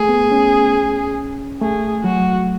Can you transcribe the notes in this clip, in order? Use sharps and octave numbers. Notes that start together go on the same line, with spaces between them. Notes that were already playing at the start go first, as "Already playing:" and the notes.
Already playing: A3 G#4
B3
C#4
A3 G#4
F#3 F#4